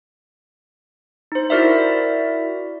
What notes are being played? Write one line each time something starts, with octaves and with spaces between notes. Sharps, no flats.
D#4 C5
E4 F#4 A#4 D5 E5